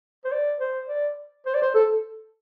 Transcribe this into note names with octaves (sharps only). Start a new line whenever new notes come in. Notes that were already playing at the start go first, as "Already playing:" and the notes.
C5
D5
C5
D5
C5
D5
C5
A4